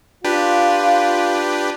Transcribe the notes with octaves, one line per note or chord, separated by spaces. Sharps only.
D4 F4 G4 B4